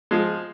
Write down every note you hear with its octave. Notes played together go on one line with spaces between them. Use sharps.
F3 G#3